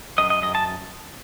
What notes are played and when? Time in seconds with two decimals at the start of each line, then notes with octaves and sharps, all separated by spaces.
0.18 F#2 D#5
0.30 D#5
0.42 F#2 D#5
0.55 A5